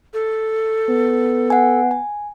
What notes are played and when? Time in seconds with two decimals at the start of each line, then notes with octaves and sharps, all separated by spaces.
0.13 A4
0.89 B3
1.50 F#5 G#5
1.91 G#5